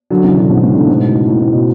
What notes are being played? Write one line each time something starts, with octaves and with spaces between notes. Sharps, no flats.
D3 F#3
C#3 E3
B2 D3
G#2 B2
A2 C#3
B2 D3
G#2 B2
A2 C#3
A2
A2
B2